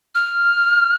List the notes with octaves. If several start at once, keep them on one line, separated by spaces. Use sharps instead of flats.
F6